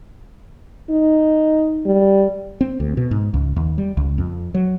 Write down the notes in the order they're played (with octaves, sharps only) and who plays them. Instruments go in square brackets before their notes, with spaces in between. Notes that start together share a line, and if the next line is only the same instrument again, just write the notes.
[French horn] D#4
G3
[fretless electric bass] C4
D2
B2
G#2
C#2
D#2
G3
C#2
F2
F#3